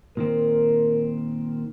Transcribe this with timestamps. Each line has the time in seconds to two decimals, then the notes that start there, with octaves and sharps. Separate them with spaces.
0.17 A#2 D#3 C4 A#4